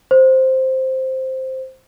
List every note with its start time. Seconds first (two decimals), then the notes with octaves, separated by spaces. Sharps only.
0.11 C5